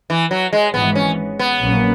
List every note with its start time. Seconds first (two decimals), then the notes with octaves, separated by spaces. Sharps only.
0.10 E3
0.31 F#3
0.53 G#3
0.74 G#1 G#2 E3 G#3 B3
0.95 C#4
1.39 B3
1.61 A#1 A#2 F#3 A#3 C#4